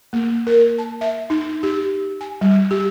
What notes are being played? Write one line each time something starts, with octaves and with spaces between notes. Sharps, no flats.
A#3
A#4
A5
E5
D#4
G4
G#5
G3
G4